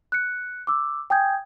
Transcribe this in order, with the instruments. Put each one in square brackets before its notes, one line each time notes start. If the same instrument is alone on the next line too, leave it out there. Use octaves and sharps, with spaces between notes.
[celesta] F#6 C#7
D6 E6
G5 G#5 D#6 G6 G#6